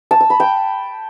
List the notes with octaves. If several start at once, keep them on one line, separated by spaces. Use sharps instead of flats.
A5
E6
B5
G5